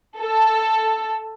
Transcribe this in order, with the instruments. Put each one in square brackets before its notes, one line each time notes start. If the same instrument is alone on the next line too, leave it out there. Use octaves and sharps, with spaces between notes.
[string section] A4